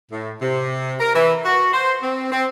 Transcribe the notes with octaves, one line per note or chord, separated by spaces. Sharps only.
A2
C3
A#4
E3
F#4
C5
C4
C4